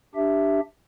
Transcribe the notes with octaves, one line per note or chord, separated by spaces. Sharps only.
D4 G4 E5